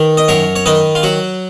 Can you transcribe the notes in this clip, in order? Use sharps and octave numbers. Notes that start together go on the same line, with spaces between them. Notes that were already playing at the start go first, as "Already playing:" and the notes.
Already playing: D#3 B4
D#5
F#2 A#4 C#5
C#5
D#3 B4 D#5
F4
F#3 F#4